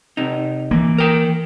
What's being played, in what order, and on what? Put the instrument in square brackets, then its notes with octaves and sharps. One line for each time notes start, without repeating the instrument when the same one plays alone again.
[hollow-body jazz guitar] C3 D#4
[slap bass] E3 A#3
[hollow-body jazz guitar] A#4 G5